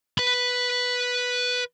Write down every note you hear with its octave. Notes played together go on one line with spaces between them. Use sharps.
B4 B5